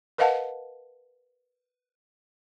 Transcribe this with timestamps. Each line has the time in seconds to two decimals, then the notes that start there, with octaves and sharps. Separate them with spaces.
0.18 A#4 B4 D#5 F5 F#5 A5